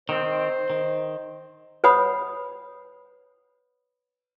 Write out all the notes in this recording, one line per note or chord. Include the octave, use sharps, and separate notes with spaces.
D#3 C4 C5
D#3
B4 C#5 F#5 B5 D#6